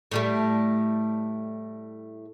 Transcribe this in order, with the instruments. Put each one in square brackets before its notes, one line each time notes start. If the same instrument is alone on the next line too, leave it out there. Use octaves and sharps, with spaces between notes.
[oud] A2 G3 A3